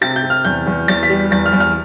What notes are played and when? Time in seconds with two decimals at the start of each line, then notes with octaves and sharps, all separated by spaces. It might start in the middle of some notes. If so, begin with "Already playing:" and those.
0.01 C3 A6
0.16 G6
0.23 C3
0.30 F6
0.45 E2 G6
0.67 E2
0.88 E2 A6
1.03 B6
1.10 G3
1.31 E2 A6
1.46 F6
1.53 E2
1.60 F6